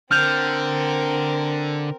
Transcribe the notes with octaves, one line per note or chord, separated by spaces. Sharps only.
D3 C4 A#4 F6 G6 F7